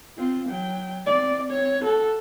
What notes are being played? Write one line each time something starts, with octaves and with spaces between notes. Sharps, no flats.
C4 F4
F#3 G5
C4 D5
C4 C#5
F#4 A4